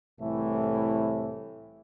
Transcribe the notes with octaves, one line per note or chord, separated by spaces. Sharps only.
C2 A2 E3 A3